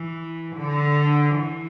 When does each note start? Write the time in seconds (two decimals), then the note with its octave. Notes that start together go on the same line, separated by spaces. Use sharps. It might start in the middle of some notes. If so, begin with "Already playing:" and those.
Already playing: E3
0.55 D3
1.34 E3